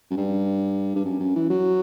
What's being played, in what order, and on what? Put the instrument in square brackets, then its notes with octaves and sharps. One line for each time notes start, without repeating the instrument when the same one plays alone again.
[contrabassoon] F#2
G2
G2
F#2
F#2
E3
F#3